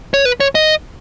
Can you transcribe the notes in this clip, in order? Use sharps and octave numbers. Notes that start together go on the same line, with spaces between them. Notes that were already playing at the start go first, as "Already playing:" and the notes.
C#5
B4
C#5
D#5